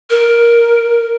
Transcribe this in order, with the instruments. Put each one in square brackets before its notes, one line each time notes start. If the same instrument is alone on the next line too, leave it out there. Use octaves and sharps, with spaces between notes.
[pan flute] A#4